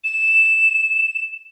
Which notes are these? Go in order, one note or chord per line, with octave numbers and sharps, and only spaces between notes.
E7